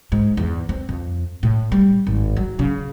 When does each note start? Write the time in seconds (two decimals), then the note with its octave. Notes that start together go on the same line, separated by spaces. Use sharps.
0.12 G#2
0.37 E2
0.69 C4
0.89 F2
1.43 A2
1.72 G3
2.07 G#1
2.37 F#3
2.59 C#3